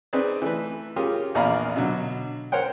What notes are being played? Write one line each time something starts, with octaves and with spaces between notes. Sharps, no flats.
C4 D#4 G#4 B4 D5
E3 A3 B4
C#4 F4 G4 G#4 A#4
A#1 E2 D5 F5 A#5 B5
B2 D3 F#3
A#4 C5 C#5 F#5 G5